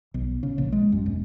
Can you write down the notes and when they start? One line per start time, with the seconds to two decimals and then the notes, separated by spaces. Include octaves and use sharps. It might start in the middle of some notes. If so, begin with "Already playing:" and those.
0.14 B1
0.43 C#3
0.58 A#1
0.72 G#3
0.92 F#2
1.06 E1